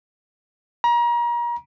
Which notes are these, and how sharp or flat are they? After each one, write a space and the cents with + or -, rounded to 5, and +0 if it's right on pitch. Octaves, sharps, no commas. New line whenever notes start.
A#5 +35